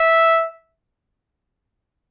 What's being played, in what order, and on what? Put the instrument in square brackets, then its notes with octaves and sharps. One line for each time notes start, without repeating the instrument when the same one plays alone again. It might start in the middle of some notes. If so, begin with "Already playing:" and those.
Already playing: [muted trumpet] E5